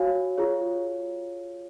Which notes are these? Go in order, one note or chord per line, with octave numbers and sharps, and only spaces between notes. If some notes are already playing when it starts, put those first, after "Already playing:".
Already playing: F#4 C#5 F5 G#5
F4 G#4 C#5